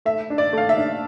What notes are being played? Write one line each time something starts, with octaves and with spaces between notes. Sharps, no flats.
A3 E5
D4
D5
A3 F5
E5
D4